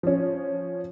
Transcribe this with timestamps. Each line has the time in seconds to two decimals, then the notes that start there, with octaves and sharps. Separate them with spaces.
0.03 F3 C#4